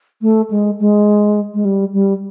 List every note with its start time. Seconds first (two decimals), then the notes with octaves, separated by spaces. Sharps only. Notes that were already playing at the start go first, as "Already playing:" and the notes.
0.22 A3
0.51 G#3
0.80 G#3
1.54 G#3
1.65 G3
1.93 G3